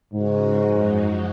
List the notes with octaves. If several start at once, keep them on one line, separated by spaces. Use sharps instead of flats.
G#2 C#3 G#3 C#4 F#4
F#2 F3 G#3 D#4 F#4